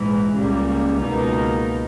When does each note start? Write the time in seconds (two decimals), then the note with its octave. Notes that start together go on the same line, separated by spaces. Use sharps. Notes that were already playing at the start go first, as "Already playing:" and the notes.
Already playing: A#1 G#2 E3
0.36 C#2 C#3 G3 A#3
1.01 C#2 B2 A#3 D#4 A#4